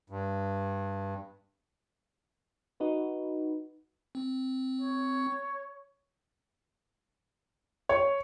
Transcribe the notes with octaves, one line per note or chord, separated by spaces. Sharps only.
G2
D#4 F#4 B4
C4
C#5
C#5